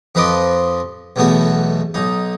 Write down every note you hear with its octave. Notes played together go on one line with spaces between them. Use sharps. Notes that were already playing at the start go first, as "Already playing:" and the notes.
F2 F3 B4 D#5 C6 D6
B1 E2 B2 A3 B3 F#4
B1 D#4